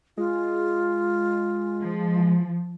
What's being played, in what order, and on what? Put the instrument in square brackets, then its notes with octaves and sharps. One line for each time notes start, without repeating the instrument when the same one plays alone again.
[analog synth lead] G#3 [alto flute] F4
[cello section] F3